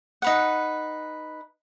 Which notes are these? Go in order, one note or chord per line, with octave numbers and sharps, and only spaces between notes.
D#4 B4 F#5